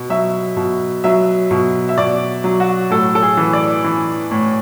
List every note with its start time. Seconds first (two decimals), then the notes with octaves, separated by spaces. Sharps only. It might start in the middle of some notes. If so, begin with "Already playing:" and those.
Already playing: B2
0.10 F#3 E5
0.57 B2
1.04 F#3 E5
1.51 B2
1.89 E5
1.98 B2 D5
2.44 F#3
2.60 F#4
2.91 A2 A4
3.15 A4
3.23 G#4
3.37 E3
3.53 D5
3.84 E3
4.31 A2